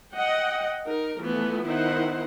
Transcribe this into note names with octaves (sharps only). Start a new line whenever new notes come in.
D#5 F#5 G5
D#4 A#4
E3 F3 A3 B3
D#3 B3 D#4 E4 C5 F#5